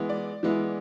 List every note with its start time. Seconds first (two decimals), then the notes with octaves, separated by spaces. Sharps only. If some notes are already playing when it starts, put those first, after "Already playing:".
Already playing: E3 G#3 B3 E4
0.09 D5
0.43 E3 G#3 B3 E4